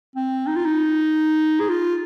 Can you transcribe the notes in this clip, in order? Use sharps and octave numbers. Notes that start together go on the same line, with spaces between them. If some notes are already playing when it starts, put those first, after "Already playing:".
C4
D#4
F4
D#4
G#4
F4